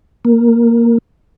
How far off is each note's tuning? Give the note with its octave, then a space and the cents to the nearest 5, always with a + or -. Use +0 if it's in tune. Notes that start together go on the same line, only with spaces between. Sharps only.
A#3 +0